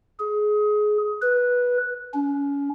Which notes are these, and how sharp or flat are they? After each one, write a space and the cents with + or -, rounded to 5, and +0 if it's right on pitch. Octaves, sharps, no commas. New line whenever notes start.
G#4 +20
B4 -10
C#4 +30